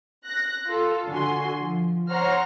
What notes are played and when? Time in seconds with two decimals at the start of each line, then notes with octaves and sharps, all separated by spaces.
0.24 F#6 A#6
0.68 F4 A4
1.08 D3 F#4 G#5 C6
1.56 F3
2.09 C5 C#5 F#5 A#5 C6 F6